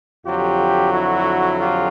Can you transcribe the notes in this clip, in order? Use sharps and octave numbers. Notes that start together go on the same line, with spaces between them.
F2 D3 F#3 F4 G4
E4 F#4
F4 G4